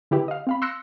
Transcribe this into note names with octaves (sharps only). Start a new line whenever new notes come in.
D3 E4 G4 B4
D#5 F5
C4 F5 B5
C6 E6 F#6 A#6 C#7